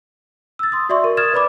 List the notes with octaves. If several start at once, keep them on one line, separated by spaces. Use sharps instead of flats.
E6 A6
C6 D#6
F#4 D5 E5 C6 C#6
A#4
D#6 F6 G#6 A6 E7
B4 D5 B5 D6